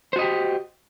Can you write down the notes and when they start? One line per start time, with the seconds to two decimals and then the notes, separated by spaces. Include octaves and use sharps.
0.13 C5
0.16 F#4
0.19 D#5
0.22 G4